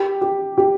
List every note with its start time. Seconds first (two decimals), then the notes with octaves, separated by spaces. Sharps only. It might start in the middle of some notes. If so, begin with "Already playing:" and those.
Already playing: G4
0.21 G4
0.58 G4